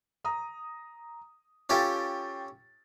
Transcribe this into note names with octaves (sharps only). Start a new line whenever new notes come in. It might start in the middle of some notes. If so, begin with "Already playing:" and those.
A#5 D#6
C#4 F4 G4 A4 G5 A6